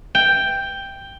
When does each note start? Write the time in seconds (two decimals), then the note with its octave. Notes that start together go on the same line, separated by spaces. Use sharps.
0.15 G5